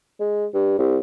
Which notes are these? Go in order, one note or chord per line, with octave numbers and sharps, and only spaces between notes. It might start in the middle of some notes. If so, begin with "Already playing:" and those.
G#3
G2
C2